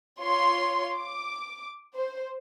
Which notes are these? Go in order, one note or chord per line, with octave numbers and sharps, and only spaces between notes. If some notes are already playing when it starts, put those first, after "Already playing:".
F4 C#5 C6
D6
C5